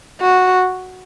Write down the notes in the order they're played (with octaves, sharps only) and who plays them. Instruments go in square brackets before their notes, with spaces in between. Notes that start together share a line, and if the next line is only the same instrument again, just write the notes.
[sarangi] F#4